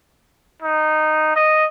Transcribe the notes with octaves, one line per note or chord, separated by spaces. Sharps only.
D#4
D#5